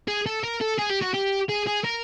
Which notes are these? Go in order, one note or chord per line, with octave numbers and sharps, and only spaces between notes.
G#4
A4
A#4
A4
G#4
G4
F#4
G4
G#4
G#4
A#4